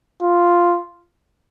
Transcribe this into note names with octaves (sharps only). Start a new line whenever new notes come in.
F4